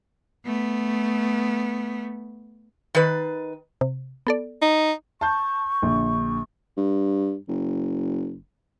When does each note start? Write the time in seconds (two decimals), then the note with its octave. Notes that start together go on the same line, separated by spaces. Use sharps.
0.46 A3 B3
2.95 D#3 B4
3.81 C3
4.27 B3 A4 D5
4.62 D#4
5.21 A5 C#6 G6
5.82 A#1 D3
6.77 G2
7.49 F#1